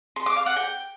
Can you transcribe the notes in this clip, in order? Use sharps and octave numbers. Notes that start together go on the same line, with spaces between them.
C6
D6
F5
F#5
G5